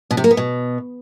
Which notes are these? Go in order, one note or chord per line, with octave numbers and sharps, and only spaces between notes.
B2
C3
A#3
B3
B2